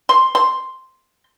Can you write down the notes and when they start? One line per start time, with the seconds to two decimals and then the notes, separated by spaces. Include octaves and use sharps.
0.09 C6
0.35 C6